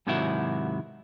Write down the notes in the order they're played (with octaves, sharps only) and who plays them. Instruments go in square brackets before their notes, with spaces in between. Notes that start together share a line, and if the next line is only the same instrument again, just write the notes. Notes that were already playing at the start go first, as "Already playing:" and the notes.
[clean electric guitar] G#2 C3 D#3 F#3 E4 F#4